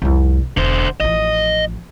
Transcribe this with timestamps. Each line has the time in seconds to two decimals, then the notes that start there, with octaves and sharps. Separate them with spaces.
0.02 C2 F2
0.57 E1 D3 C5
1.00 A1 F3 D#5